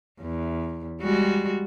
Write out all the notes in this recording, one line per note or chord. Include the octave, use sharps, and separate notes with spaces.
E2
G3 G#3 F#4